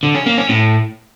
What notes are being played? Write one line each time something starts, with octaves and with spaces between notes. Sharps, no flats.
D3
C#4
A#3
C#4
A2